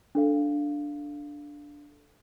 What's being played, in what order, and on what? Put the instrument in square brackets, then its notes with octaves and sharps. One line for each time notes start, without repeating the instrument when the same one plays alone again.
[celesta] D4 A4 F5